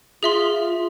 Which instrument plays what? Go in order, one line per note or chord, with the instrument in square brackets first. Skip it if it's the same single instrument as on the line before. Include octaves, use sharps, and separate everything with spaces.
[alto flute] F4 [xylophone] G#4 E5 C6